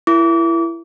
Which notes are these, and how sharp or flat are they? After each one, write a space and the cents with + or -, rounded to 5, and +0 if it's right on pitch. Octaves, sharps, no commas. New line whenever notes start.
E4 +20 A#4 +20 D6 -35